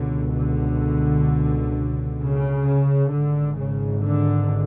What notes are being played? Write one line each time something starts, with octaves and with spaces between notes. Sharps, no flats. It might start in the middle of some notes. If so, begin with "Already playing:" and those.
Already playing: C#2 B2 D3
D3
C#3
G#1 G#2 D3
C#3
D3